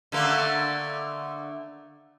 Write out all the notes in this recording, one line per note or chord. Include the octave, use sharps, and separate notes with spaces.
D3 A3 A#3